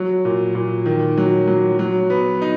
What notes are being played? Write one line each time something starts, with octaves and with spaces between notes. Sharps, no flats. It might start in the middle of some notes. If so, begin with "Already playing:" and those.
Already playing: F#3
A#2
A#2
D#3
F#3
F#3
F#3
B3
D#4